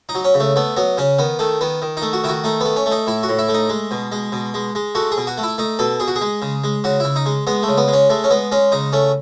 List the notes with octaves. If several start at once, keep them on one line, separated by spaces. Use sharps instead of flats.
D#4
F#3
C#4
C#3
A3
A3 B3
F#3 B3
C#3 C#4
D#3 B3
D#3 A3
D#3 B3
D#3
A3 D#4
F#4
D#3 E4 F#4
A3 D#4
A3 B3
C#4
A3
D#4
A2 E4
F#4
A2
E4
A3
D#4
G#3
B2
G#3
B2
G#3
G#3
A3 F#4
G#4
B2
F#4
A3
E4
A3 D#4
B2 A4
B2 G#4
F#4
G#4
G#3
C#3
G#3
C#3 F#4
C#3 E4
D#4
G#3
G#3 B3
A3
C#3
B3
G#3
C#4
G#3 A3
C#4
G#3 B3
G#3 C#4
C#3 D#4
A3 C#4